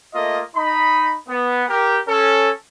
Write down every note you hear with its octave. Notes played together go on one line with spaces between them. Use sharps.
A3 A#3 F4 D#5
D#4 B5
B3
G4 A#4
C#4 A4